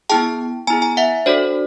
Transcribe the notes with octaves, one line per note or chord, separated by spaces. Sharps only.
B3 E4 G#4 G5 A5
B3 E4 G#4 G#5 A#5
G#5 A#5
E5 F#5
D4 F#4 A4 C5 D5